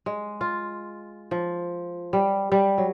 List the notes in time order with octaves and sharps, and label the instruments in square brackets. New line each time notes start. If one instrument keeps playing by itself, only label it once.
[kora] G#3
F4
F3
G3
G3
F#3